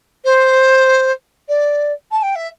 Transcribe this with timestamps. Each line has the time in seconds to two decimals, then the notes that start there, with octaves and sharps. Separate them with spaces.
0.24 C5
1.48 D5
2.11 A5
2.22 G5
2.35 E5